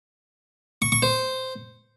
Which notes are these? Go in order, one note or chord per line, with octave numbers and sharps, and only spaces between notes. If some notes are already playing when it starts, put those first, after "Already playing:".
C#6
C#6
C5